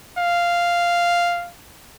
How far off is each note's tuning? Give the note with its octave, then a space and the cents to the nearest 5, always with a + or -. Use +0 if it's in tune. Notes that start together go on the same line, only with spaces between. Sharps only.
F5 -5